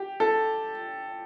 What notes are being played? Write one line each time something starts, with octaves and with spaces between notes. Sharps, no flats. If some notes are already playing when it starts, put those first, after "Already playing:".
Already playing: G4
A4